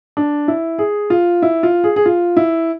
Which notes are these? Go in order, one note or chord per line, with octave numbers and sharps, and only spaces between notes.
D4
E4
G#4
F4
E4
F4
G#4
G#4
F4
E4